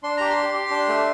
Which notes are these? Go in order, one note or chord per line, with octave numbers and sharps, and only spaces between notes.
D4 C6
G4 A#5
C6
G4
G4
D4
A3